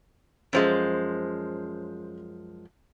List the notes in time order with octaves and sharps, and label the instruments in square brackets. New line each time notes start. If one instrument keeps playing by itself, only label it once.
[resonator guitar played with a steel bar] F#2 F3 G#3 [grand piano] C#4 C5